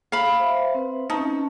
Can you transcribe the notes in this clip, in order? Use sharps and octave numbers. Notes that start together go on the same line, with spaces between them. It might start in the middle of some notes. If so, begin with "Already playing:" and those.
F5 B5
C5 E5
C4 B4
C#4 D#4 E4 A5